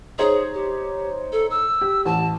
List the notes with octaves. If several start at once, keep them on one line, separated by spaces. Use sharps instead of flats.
D#4 G#4 C5 C#5
G4
A4
E6
G4
A1 A5